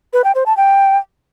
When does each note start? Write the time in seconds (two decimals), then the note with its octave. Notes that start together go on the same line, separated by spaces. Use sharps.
0.13 B4
0.24 G5
0.35 C5
0.46 A5
0.57 G5